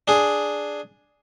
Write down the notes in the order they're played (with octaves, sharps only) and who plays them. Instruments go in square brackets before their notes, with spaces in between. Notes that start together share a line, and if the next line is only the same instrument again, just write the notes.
[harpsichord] D4 G#4